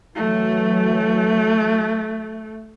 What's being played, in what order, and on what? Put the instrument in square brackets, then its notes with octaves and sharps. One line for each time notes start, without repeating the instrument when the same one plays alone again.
[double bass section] E3 F#3 [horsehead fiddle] A3